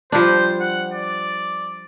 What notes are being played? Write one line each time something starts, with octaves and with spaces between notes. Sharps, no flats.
F3 G3 D4 C5
F#5
D5